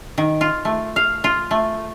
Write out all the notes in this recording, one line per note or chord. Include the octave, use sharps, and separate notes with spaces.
D#3
F4
A3
F5
F4
A3